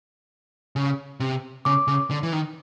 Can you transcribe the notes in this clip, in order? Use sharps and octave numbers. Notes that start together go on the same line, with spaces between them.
C#3
C3
C#3 D6
C#3
D3
E3
D#3